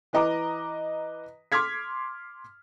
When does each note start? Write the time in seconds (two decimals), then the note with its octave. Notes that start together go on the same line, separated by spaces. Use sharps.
0.13 E3 B4 D#5 A#5 D6
1.52 C6 D6 F6 G#6 B6